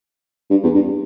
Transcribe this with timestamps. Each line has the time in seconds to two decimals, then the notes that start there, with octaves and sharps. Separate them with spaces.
0.50 G2
0.63 E2
0.74 G2